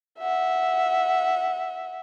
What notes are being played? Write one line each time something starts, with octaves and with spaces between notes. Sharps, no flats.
E5 F#5